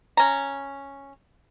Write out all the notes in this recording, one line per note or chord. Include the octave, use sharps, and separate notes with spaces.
C#4 A#5